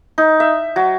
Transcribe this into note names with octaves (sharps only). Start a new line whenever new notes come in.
D#4
E5
F#3